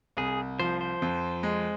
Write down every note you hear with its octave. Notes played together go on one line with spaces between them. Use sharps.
C2 G#4
F3 C5
C5
F2
G#3